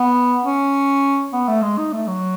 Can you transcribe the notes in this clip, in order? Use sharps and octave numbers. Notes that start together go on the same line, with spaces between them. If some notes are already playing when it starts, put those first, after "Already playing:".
Already playing: B3
C#4
B3
A3
G#3
D#4
A3
F#3